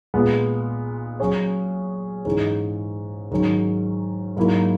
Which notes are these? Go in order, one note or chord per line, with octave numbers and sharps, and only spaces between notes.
A#2 G#3 B3
F#3 C#4 G#4 C#5
G#2 E3 G#3 C#4
G#2 D#3 F#3 C#4
G#2 F#3 A#3 E4 A#4